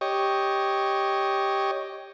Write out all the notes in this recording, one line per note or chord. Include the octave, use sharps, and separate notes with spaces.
G4 C#5 D#5